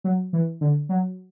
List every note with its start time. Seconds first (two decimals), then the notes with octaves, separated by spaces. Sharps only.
0.04 F#3
0.33 E3
0.61 D3
0.89 F#3